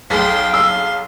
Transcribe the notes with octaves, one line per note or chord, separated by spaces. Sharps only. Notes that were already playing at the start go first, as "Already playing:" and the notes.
B1 G#4 F5 G5 C6 B6
C6 E6